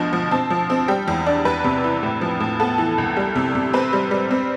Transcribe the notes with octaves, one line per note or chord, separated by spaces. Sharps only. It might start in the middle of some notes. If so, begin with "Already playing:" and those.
Already playing: D2 B2 F3
F3
C4 A5
F3
C4
G3 G5
E2
D4
E2 B4
C3
E3
A2
F3
A2
B3 A4
E3
C2
G3
C3
C3
C4 B4
G3
G3
C4